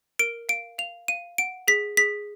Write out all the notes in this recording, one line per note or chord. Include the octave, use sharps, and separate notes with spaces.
A#4 D7
F5 D7
F5 F7
F5 D#7
F#5 D7
G#4 B6
G#4 B6